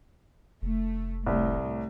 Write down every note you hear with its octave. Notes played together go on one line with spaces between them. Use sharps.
F1 A3
C2 A2